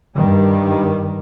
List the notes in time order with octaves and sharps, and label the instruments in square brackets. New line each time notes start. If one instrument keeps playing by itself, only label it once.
[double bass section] G2 D#3 G3